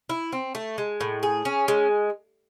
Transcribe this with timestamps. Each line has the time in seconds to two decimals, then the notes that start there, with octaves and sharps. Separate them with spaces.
0.09 E4
0.32 C4
0.55 A3
0.78 G#3
1.01 A2
1.23 G#4
1.45 C#4
1.68 G#3